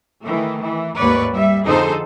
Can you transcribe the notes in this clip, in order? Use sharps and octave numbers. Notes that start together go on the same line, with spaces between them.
D#3 E3 A3
E3
D#2 G#2 B4 C#5 D5
G3 E5
F2 D3 D#4 G#4 A4 C5